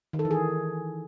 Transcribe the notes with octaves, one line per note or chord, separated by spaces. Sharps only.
D#3
A4
E3
G#4